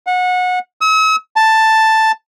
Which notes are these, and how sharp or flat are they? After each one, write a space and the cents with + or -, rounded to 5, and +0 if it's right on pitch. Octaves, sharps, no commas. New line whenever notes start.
F#5 -25
E6 -45
A5 +5